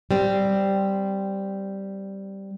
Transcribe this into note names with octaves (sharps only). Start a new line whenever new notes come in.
G3 C4